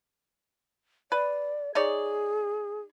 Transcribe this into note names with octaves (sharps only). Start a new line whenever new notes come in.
B4 D5
D#4 G#4 C#5 D5